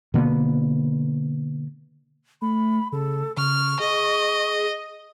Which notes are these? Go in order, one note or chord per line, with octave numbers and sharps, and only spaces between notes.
B2 D3 A#3 B3
A3 B5
C#3 A4
C#3 C#6 F6
G#4 D#5